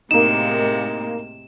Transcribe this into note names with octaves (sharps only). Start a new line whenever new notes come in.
A2 C3 G#3 A#3 D#4 E7